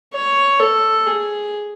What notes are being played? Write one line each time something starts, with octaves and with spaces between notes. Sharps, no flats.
C#5
A4
G#4